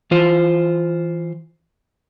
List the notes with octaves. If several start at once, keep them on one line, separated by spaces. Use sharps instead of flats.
E3 F4 C5